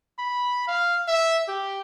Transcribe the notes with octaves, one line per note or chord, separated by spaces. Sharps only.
B5
F5
E5
G4